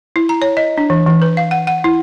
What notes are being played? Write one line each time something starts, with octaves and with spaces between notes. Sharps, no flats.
E4
A#5
C#5
D#5
D4
E3
E3
B4
F5
F#5
F#5
E4